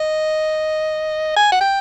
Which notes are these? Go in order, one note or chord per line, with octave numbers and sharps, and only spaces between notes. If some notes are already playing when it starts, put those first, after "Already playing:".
Already playing: D#5
G#5
F#5
G5